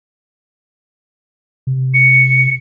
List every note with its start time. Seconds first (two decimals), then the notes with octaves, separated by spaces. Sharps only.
1.67 C3
1.94 C#7